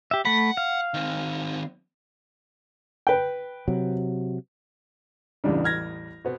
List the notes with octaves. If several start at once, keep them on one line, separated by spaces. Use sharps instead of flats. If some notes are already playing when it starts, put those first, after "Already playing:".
G4 E5
A3 F#5 B5
F5
D#3 C4
B4 G5
C3 F#3
A1 E2 C#3 G3 D4
F6 G#6 A#6
B2 B3 C4